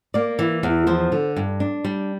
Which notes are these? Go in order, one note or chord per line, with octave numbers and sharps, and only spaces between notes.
A#3 D5
E3
E2
F3 C5
D3
G2
D4
G3